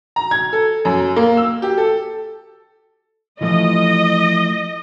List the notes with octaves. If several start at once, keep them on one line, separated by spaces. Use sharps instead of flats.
A#5
G#6
A4
F#2
A#3
E6
G4
A4
E3 F3 A3 D#5